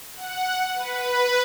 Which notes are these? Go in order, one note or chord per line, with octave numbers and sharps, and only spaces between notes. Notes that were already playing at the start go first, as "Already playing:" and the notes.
F#5
B4